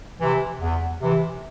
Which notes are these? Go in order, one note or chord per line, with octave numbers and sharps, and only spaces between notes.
C3 E3
E2
C3 E3